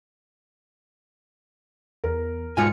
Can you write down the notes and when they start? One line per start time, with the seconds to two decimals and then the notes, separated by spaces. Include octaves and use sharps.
2.04 E2 A#4
2.57 B1 G#2 G#3 F4 G#5 C#7